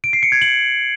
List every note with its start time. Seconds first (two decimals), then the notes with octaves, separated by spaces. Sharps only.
0.04 D7
0.13 C7
0.23 C#7
0.32 G#6
0.42 F#7